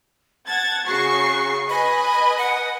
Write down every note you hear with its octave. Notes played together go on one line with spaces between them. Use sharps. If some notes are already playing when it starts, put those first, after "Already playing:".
F#5 A5 G#6 A6
C#3 F#4 C#6 C7
B4 D#5 G#5 B5
F#5